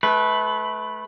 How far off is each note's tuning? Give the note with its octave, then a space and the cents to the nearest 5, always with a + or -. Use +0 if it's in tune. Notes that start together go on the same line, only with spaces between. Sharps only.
A3 -30 B4 +0